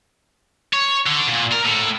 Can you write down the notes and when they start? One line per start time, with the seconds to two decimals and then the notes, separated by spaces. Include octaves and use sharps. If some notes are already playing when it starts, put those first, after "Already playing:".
0.73 C#5
1.06 D3
1.28 A#2
1.52 A#4
1.66 A2